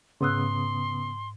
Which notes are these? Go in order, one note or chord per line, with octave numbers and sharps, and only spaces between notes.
G#2 C#3 B3 C6 D#6 E6 F#6